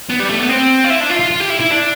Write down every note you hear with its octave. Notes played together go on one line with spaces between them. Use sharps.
B3
G3
A3
B3
C4
F4
E4
D4
F4
F4
F4
G4
E4
E4
D4